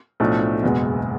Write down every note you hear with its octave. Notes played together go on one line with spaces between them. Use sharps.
B1 A2 F3 A3 D4
F#1 E2 B2 G#3